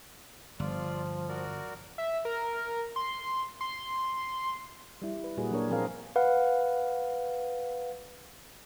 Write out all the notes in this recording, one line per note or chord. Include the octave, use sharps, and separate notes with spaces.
G1 F3 F4 D5
F#4 A#4 D5
E5
A#4
C6
C6
G3 E4
B4
A#2 G3 A#3 F#4 G#4 B4
F#3 A#3 D4 A#4 C#5
A#2 F3 C4 G#4 A#4 F5
B4 F5 F#5